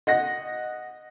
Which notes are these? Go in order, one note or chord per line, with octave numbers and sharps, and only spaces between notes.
D#5 F#5 A#6